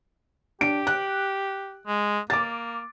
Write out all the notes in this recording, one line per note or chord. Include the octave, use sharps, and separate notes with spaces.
D4 G4 D7
F#6
G#3
A#3 D6 A6